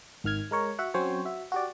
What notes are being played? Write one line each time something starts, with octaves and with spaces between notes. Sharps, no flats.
G#1 D#3 F6 G#6
G#3 A#4 C#5
F#4 E5 F#5
F#3 C4 C#4 C5 C#5
F#4 E5
F#4 G4 D5